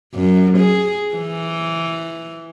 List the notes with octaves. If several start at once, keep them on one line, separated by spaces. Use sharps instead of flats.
F#2
G#4
E3